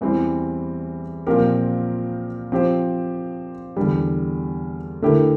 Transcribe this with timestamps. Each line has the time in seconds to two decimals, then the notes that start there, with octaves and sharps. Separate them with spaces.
0.01 E2 E3 G3 C4 G4
1.27 A#2 F3 C4 G4 A#4
2.52 F3 C4 G4 C5
3.77 E2 D3 G3
5.02 D3 A3 E4 G4 A#4